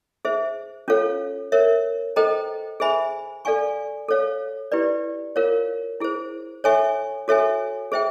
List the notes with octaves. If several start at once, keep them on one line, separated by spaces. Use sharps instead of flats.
G#4 C5 E5
C#4 F4 A4 C#5 F5
A#4 C#5 E5
A4 C5 D#5 G5 A#5
G#4 C5 E5 G#5 B5
A4 D5 F5 G#5 C#6
A4 C#5 F5
E4 G4 B4 D5
F4 A#4 C#5 F5
E4 G#4 C5
A4 C#5 E5 G#5 C#6
F#4 A4 C#5 E5 G#5
G#4 C5 E5 G5